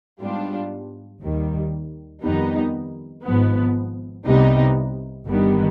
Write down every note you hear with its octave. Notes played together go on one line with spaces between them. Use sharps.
G#2 G3 B3 D4 F4
D#2 D#3 G3
F2 D#3 G3 B3 D#4
G#1 G#2 F3 B3
C2 C3 G3 B3 D#4
G1 G2 D#3 G3 B3